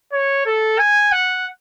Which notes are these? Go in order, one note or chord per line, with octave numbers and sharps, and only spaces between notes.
C#5
A4
G#5
F#5